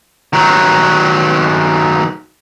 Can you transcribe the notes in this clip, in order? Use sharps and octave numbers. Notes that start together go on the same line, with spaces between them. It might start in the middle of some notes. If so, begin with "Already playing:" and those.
D#3 F#3